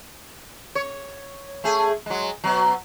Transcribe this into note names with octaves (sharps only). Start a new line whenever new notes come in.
C#5
A3 G#4
F#3 G#3
B2 F#3